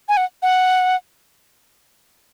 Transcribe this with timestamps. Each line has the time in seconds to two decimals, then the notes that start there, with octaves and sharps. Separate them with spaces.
0.09 G#5
0.17 F#5
0.42 F#5